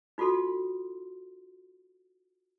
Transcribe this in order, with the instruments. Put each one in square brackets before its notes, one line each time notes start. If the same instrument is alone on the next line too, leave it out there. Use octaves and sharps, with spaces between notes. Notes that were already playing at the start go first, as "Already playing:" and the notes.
[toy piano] D#4 F4 F#4 A4 C6